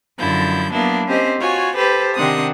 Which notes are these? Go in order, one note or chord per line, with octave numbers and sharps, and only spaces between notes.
F#2 D3 F3 E4 G6
F#3 A#3 B3 D4 E4
C4 C#4 G4 C5 D#5
F4 F#4 C#5 G#5
G4 A4 B4 C5
C3 D#3 C4 D4 F#5 D#6